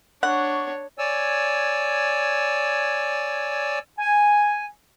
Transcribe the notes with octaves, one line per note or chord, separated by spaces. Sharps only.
D4 C#5 F#5 C#6
C#5 D5 G#5 E6
G#5